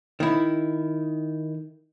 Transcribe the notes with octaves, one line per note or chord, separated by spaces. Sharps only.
D#3 E4